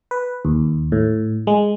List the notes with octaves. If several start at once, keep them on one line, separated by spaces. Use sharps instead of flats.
B4
D#2
A2
G#3